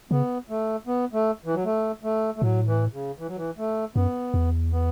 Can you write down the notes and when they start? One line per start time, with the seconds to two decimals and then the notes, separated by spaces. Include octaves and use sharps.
0.11 C#3 B3
0.49 A3
0.87 B3
1.13 A3
1.45 E3
1.54 F#3
1.65 A3
2.03 A3
2.36 A3
2.42 A2 F#3
2.67 E3
2.93 C#3
3.19 E3
3.28 F#3
3.36 E3
3.58 A3
3.96 F#2 B3
4.34 E2
4.72 B3